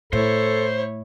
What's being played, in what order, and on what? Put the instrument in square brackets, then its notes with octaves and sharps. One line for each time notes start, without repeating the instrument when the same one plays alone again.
[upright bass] A2 [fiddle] E4 C#5 [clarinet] A4 [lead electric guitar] C5